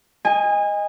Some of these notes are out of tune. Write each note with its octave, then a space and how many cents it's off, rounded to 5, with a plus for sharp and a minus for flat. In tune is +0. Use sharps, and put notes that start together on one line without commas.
D#5 +0 G#5 -30